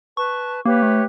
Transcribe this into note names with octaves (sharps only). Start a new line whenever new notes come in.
B4 A5 C#6
A#3 G4 B4 C#5
A3